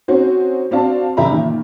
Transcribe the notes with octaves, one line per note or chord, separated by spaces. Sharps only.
C4 C#4 D#4 F#4 C5
C4 D4 F#4 F5 A5
F#1 E2 G4 E5 A#5 B5
A#2 D#3